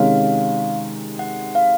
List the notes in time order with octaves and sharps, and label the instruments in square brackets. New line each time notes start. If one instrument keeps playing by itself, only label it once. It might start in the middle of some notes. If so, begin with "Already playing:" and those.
Already playing: [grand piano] C3 D#3 G#3 C#4 [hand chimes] F5
[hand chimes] F#5
F5